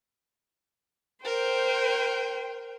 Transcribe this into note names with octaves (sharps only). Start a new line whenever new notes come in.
A#4 C5 G5